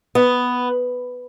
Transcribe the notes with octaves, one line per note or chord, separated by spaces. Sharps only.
B3